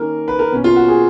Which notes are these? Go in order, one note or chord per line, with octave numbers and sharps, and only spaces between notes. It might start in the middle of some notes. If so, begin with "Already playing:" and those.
Already playing: D#3 A#3 C#4 A#4
B4
A#4
B2 A#3 C#4
F4
F#4
G#4